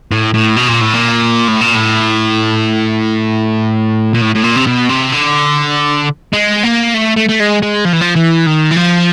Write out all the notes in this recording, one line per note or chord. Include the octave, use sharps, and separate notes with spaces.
A2
A2
B2
A#2
A2
A#2
A2
A#2
A2
A#2
A2
A2
A#2
C3
B2
C3
D3
G#3
A#3
A3
A3
A3
G#3
G#3
F3
E3
F3
E3
D#3
E3
F3